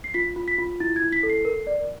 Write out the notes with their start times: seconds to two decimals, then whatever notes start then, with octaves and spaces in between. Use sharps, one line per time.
0.04 C7
0.14 F4 B6
0.36 F4
0.48 B6
0.58 F4
0.80 E4 A6
0.96 G#6
1.02 E4
1.12 B6
1.23 A4
1.29 C7
1.45 A#4
1.67 D5